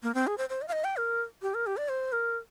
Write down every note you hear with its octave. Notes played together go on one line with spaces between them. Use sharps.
A#3
C4
G#4
C5
C5
D#5
F5
D#5
G5
A#4
G4
A#4
G4
D5
C5
A#4